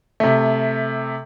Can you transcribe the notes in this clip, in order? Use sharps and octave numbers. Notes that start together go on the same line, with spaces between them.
C3 A3